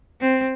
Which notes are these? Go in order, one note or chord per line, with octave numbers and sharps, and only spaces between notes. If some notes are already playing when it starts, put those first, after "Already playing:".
C4